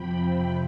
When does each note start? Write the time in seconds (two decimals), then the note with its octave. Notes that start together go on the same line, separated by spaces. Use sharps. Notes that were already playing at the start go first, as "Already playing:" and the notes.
Already playing: F2 C3 F3 G5 B5